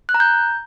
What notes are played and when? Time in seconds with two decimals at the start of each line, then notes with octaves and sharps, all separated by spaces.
0.09 F#6
0.14 A#5
0.20 G6